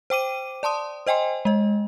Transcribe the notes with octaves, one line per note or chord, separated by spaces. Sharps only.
C5 G5 D6 D#7
D5 A5 C6 D#6
C5 D#5 G5 G#5 C6
G#3 D#5